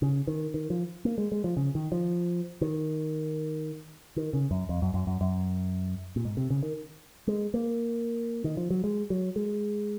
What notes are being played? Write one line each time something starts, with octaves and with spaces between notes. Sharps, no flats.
C#3
D#3
D#3
F3
A#3
G#3
G#3
F3
C#3
D#3
F3
D#3
D#3
C#3
F#2
F2
F#2
F#2
F#2
F#2
A#2
G#2
C3
C#3
D#3
G#3
A#3
D#3
F3
F#3
G#3
F#3
G#3